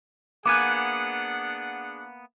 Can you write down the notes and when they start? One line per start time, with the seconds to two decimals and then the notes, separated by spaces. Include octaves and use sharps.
0.46 A#3 B3 D4 G#4 F#5 G#5 D6 F#6